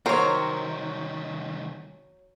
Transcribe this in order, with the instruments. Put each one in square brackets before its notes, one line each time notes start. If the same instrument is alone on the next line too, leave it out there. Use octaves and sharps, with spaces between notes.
[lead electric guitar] C2 D#3 [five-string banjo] F#3 C5 [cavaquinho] A#4 C#5